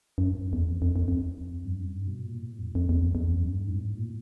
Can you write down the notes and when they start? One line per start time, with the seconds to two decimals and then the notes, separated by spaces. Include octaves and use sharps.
0.18 F#2
0.53 E2
0.70 F2
0.82 F2
0.96 F2
1.08 F2
1.65 G2
1.73 F#2
1.90 G2
2.07 B2
2.25 A#2
2.42 A2
2.59 F2
2.75 F2
2.89 E2
3.02 F2
3.15 E2
3.28 F2
3.40 F#2
3.54 G2
3.67 G#2
3.79 A2
3.96 A#2